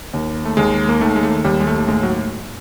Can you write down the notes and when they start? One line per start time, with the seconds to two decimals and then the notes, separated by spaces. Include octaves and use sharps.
0.13 D#2
0.45 A3
0.57 D#2 G#3
0.89 A#3
1.01 D#3 A3
1.16 G#3
1.23 A3
1.44 D#2 G3
1.60 G#3
1.67 A3
1.78 A3
1.88 A2 G#3
2.03 F#3